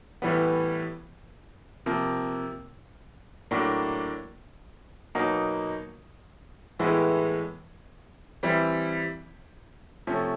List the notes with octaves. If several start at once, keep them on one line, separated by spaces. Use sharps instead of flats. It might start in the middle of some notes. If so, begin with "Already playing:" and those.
A2 E3 G3 B3
C3 F3 A#3
A2 F#3 A#3 D4
B2 F#3 A#3 D#4
A2 E3 G#3 B3 E4
E3 G3 C4 E4
C3 F3 A3 C#4